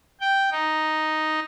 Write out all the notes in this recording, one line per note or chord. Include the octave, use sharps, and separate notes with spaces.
G5
D#4